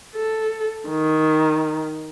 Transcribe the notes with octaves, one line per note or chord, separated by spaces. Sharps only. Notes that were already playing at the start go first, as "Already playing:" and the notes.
A4
D#3